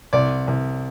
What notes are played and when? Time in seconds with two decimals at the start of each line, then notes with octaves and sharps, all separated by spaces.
0.13 C2 D5
0.47 C2